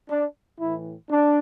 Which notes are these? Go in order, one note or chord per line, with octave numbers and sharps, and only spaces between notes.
D4
A2 E3 E4
D4